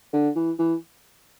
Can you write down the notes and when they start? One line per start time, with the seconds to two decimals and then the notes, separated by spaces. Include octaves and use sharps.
0.13 D3
0.36 E3
0.59 E3